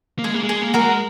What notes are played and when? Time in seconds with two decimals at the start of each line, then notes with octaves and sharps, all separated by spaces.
0.19 A#3
0.24 G#3 G#4
0.34 A#3
0.43 G#3
0.49 G#4
0.62 A#3
0.74 A#3 F#4 A#4
0.80 G#3